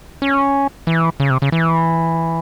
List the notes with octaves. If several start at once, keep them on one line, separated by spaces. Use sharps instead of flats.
C#4
E3
C#3
C3
C#3
E3